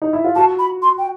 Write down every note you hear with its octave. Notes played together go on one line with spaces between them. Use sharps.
D#4
E4
F4
F#4 A5
B5
C6
G5